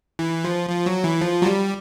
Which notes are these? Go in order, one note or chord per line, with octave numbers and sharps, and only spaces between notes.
E3
F3
F3
F#3
E3
F3
F#3
G3